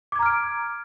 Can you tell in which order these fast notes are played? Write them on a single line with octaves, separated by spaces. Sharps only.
D6 G#6 A#5 F6 D7